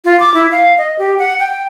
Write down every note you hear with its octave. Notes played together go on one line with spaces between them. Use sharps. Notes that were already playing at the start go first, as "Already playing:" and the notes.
F4
D6
E4
F5
D#5
G4
F#5
G5